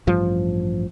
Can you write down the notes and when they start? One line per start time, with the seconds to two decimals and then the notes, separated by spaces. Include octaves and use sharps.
0.07 A1 G2 F3